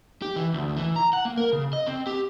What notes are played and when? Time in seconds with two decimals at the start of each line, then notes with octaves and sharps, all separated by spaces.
0.22 G4
0.36 E3
0.54 D2
0.76 E3
0.96 A#5
1.13 F#5
1.25 A#3
1.37 A#4
1.53 C#3
1.73 D#5
1.87 C4
2.07 G4